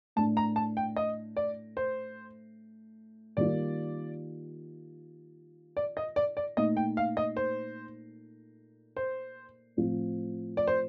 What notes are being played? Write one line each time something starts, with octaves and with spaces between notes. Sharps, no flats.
A2 A3 D4 A5
A#5
A5
G5
D#5
D5
C5
D#3 G3 A#3 F4 D5
D5
D#5
D5
D5
A#2 A3 D#4 D#5
G5
F5
D#5
C5
C5
A2 F3 C4 F4
D5
C5